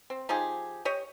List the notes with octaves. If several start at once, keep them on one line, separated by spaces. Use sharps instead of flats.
C4
F3 D#4 G4 G#4
G4 C#5 D#5